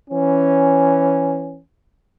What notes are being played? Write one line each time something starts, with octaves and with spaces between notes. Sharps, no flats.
E3 C#4